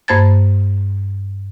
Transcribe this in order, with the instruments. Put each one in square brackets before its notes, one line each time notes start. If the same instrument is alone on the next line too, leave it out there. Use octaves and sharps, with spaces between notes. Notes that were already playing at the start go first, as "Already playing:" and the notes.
[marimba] G2 A#3 C5 A5 G#6 A6